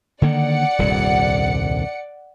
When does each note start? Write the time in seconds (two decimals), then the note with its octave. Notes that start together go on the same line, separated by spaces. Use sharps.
0.22 D3 D#3 A#3 D5 F#5 C#7
0.79 D#1 C2 G2